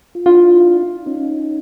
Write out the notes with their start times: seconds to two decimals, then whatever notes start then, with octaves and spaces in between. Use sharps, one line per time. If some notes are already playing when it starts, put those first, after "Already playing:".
0.15 F4
0.26 D4 E4 F4
1.06 C#4 D#4